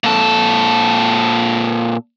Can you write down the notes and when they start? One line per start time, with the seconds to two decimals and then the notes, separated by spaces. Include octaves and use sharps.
0.04 A#2 A4